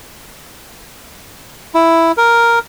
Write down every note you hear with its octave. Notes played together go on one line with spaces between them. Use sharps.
E4
A#4